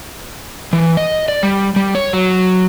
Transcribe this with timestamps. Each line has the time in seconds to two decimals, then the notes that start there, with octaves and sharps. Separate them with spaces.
0.73 E3
0.97 D#5
1.28 D5
1.43 G3
1.76 G3
1.95 C#5
2.13 F#3